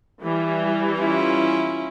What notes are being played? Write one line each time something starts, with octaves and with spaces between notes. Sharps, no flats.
E3 G3
C#4 E4 F4